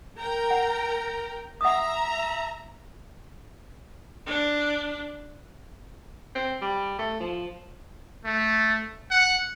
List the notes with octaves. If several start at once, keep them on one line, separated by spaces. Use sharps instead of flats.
A#4 G5 A#5
F#5
E5 F#5 A#5 D#6
D4
C4
G3
A3
F3
A3
F#5